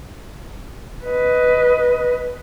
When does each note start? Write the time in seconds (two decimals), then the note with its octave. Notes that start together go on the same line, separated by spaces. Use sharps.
1.05 B4 D#5